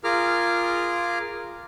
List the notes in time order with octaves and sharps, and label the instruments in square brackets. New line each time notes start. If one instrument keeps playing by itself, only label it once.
[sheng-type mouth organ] F4 G#4 A#4 A#5 D6 F6